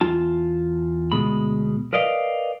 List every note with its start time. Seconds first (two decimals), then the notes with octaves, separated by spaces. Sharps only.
0.01 E2 F4 A5
1.12 D2 B2 G#3 B5
1.93 A#4 B4 D5 D#5 F5